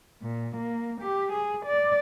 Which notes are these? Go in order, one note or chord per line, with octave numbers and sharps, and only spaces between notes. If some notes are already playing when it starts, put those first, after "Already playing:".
A#2
A#3
G4
G#4
D5